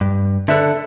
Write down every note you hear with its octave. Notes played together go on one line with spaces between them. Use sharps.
G2
D3 D4 A4 B4 E5